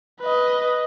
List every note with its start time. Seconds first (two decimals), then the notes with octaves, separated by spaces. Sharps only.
0.22 B4 D#5